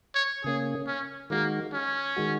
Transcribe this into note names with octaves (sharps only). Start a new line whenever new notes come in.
C#5
C#3 A#3 C#4 G#4
C#4
D#3 G#3 A#3 F#4
C#4
D#3 G#3 F#4